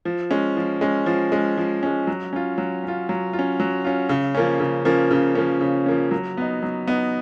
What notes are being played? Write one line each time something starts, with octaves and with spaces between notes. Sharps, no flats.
F3
G#3 C#4
F3
G#3 C#4
F3
G#3 C#4
F3
G#3 C#4
F#3
C#4 F4
F#3
C#4 F4
F#3
F4
C#4
F#3
C#4 F4
C#3
F3 A#3 C#4
C#3
F3 A#3 C#4
C#3
F3 A#3 C#4
C#3
F3 A#3 C#4
F#3
B3 D#4
F#3
B3 D#4